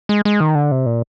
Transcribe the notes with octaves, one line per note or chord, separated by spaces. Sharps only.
G#3
G#3
D#3
D3
C3
A#2